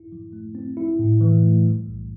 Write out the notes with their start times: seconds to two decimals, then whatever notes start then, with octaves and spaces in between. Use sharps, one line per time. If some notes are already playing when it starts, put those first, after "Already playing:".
Already playing: E4
0.12 F3
0.33 A3
0.55 C4
0.77 E4
0.99 A2
1.21 E3
1.43 A3
1.64 G3
1.87 B1